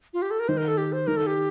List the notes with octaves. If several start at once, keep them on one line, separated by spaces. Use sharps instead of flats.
F4
G4
A4
A#4
D#3 C5
A#4
A4
G4
C5
D#3 A#4
A4
G4